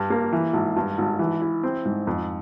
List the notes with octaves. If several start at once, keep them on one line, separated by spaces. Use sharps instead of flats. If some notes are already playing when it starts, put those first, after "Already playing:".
Already playing: G2
A#3
E3
G#1
G2
G#1
E3
E4
C4
G#2
F2